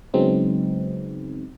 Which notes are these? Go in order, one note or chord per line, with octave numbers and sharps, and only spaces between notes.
C#3 F#3 G#3 B3 C4 D#4